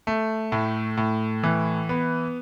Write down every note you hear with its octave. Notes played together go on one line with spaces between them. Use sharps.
A3
A2
A2
E3
B3